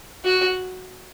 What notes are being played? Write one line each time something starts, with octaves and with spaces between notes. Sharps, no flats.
F#4